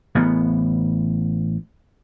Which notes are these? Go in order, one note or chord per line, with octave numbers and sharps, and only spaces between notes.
A1 B3